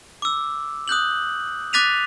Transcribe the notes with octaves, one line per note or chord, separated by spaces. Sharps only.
D6 E6
D#6 F#6 G6 F#7
D6 F#6 A6 B6 D#7 F7